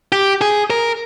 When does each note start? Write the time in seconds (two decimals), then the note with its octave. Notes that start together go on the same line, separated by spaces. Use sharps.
0.12 G4
0.41 G#4
0.70 A#4